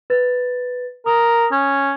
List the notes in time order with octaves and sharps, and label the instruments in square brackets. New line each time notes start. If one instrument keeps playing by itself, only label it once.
[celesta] B4 A6
[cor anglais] A#4 [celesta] D#6
[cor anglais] C#4